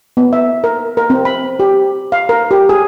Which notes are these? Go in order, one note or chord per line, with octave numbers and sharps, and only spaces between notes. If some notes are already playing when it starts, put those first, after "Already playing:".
B3
E5
A#4
A#4
C4
B5
G4
F5
A#4
G4
G#4